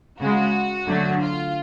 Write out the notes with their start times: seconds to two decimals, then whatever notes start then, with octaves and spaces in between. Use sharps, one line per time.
0.19 C#3 G#3 F#4
0.87 D3 F#3 A3
1.21 F4